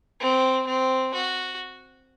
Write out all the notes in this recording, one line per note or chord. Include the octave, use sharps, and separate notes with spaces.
C4
C4
F#4